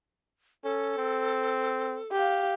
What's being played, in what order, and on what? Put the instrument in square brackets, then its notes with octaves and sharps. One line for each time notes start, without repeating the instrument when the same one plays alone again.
[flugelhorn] C#4 [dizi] A4
[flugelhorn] C4
[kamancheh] G4 F5